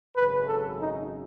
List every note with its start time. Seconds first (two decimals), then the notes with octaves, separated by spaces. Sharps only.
0.16 G#1 F#2 C#3 B4
0.48 A4
0.81 D#4